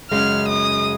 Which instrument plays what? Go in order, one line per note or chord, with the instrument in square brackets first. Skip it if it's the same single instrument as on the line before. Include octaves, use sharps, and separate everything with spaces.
[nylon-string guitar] F#2 C#3 G#3 C#4 [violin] F6
[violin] D#6